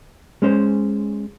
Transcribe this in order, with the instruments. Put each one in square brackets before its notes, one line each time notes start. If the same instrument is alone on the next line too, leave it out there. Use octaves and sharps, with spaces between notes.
[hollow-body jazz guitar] G#3 C#4 C5